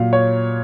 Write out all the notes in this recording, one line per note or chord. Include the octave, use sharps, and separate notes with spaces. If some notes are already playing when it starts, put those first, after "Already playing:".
Already playing: A#2 F#3 F5
C#5